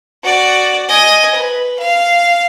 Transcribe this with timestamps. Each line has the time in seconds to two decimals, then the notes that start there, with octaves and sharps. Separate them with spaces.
0.23 F#4 D5
0.89 D#5 G#5
1.35 B4
1.79 F5